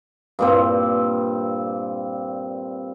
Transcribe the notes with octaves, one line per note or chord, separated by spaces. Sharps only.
G2 A#2 C4